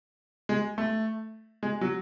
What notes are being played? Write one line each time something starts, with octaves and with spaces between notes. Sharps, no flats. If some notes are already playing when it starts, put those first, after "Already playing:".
G#3
A3
G#3
F#3